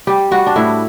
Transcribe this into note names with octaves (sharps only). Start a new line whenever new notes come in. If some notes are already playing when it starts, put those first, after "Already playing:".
G3 G4
G3 F#4
D4
A2 E4